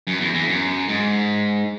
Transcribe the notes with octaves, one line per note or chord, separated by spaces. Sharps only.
F#2
E2
E2
F#2
G#2